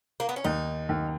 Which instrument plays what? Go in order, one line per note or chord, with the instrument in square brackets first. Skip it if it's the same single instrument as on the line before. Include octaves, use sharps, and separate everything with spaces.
[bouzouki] A#3
B3
C#4
[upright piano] D#2 [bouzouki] D#4
[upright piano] D#2